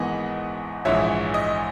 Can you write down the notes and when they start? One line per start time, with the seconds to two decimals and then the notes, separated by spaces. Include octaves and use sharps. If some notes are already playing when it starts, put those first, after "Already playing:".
Already playing: G#1 G#2 E3 B3 D#4 D#5 F#5
0.85 A#1 G#2 E3 C#5 E5
1.34 D#5